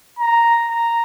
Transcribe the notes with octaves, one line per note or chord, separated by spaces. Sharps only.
A#5
A#5